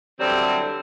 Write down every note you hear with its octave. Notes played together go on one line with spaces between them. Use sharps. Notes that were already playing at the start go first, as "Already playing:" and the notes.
D3 E3 F#3 G3 C4